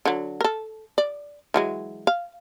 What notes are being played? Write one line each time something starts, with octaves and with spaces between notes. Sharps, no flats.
D3 F#3
A4 A#4
D5
E3 F#3 G#3
F5